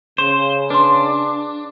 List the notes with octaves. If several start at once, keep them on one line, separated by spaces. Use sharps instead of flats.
C#3 C5
D4 B4 C6